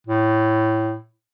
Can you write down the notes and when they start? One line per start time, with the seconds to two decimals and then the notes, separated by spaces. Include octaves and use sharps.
0.07 A2